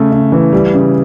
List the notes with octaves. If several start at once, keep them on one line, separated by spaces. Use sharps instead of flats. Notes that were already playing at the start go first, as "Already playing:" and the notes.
Already playing: C#3 A3
C#3
E3
G3
C#3